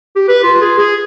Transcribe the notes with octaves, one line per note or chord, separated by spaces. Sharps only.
G4
B4
F4
G#4
G#4